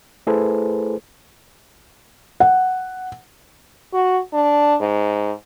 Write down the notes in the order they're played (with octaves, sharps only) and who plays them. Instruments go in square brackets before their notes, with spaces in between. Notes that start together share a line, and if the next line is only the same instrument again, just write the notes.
[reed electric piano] A3 E4 G#4 A4 B4 C5
[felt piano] F#5
[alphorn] F#4
D4
G#2